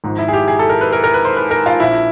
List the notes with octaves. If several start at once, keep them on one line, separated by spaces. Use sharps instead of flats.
G#1 G#2 F3
E4
G#4
G4
G#4
A4
A#4
B4
A#4
A#4
B4
C5
B4
A#4
F4
A#1 A#2 F3 E4